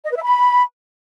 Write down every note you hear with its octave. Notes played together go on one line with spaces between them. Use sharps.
D#5
B4
E5
B5